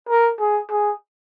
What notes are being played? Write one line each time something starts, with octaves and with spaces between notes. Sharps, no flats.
A#4
G#4
G#4